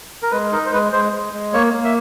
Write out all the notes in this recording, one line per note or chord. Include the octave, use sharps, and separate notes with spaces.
A#4
G#3 B4
D#4 A#4
C5
G#3 B4
G#3 C5
G#3
G#3
A#3 C#5
A#3
E5